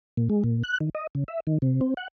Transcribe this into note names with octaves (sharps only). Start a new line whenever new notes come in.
A#2
G#3
A#2
F#6
D#3
D#5
C#3
E5
D#3
C3
C4
F#5